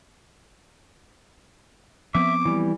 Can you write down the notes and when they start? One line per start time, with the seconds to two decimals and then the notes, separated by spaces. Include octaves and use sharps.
2.15 F3 B3 C4 E5 D6
2.45 E3 G3